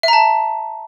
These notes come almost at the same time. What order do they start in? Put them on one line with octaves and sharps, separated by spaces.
E5 A#5 A5